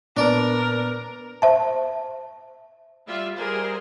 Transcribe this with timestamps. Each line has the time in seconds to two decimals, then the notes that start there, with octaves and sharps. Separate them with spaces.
0.17 A#2 B3 D4 A#4 B4 D5
1.42 C5 E5 A5
3.07 G3 F4 E5
3.37 G3 G#4 A#4 C5